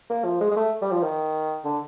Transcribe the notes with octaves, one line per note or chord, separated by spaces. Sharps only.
A#3
F3
G#3
G#3
A3
G3
F3
D#3
D3